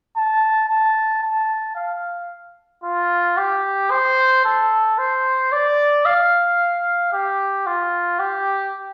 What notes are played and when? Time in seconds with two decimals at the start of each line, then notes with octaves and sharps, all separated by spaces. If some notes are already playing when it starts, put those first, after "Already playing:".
0.16 A5
0.69 A5
1.23 A5
1.76 F5
2.84 F4
3.37 G4
3.91 C5
4.45 A4
4.98 C5
5.52 D5
6.05 F5
7.13 G4
7.67 F4
8.19 G4